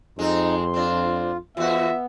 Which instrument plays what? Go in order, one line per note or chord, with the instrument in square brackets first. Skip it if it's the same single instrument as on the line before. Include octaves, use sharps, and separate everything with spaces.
[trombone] F2 [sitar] G#3 C4 [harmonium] D#4 [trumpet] C6
[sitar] C4 D4 [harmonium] F4
[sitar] E2 F#4 [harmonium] B3 [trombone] F4 [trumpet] E5